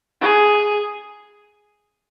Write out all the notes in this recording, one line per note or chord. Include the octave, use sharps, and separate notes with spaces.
G#4